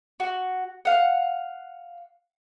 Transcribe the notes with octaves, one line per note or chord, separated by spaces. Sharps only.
F#4
F5 F#5